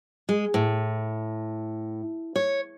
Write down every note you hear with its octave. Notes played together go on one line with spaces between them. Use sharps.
G#3
A2
C#5